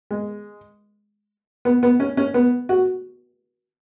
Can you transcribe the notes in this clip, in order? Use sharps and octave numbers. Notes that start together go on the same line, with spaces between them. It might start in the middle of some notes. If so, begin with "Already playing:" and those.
G#3
B3
B3
C#4
C#4
B3
F#4